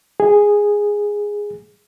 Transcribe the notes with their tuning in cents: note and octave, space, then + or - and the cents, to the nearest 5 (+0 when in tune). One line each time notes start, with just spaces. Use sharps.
G#4 -5